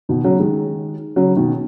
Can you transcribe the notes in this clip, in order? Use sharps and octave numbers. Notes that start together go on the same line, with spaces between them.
B2 D#3
C#3 F#3
D#3 G#3
C#3 F#3
B2 D#3